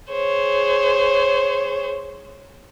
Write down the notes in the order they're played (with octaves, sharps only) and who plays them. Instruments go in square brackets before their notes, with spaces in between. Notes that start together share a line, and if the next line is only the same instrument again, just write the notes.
[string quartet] G#4 C5 C#5